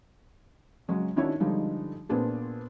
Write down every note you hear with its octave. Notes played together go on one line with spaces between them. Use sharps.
C#3 F#3 G#3 C#4
D#3 C#4 D4 E4 F#4 C#5
D3 F3 G3 G#3 D#4
A#2 B3 C4 D4 G#4